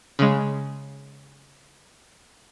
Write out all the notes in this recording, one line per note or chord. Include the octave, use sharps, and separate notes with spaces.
C#3 G#3